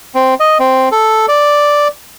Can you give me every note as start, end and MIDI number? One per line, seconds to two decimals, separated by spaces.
0.15 0.34 60
0.40 0.58 75
0.60 0.89 60
0.92 1.26 69
1.28 1.88 74